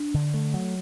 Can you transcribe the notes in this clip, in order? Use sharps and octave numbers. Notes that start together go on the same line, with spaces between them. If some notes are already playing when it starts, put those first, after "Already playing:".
Already playing: D4
D3
A3
F#3